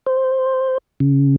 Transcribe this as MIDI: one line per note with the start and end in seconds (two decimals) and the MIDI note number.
0.06 0.78 72
1.00 1.36 49